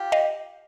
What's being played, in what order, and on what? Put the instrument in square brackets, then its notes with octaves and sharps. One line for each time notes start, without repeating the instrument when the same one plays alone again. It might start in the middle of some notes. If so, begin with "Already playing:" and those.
Already playing: [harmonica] F4 G4
[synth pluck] D#5 F5